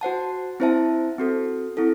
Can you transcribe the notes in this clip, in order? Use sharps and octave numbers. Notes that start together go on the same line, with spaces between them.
F#4 C5 F#5 A5
C4 E4 C5 E5 A5
C4 F#4 A4
C4 E4 A4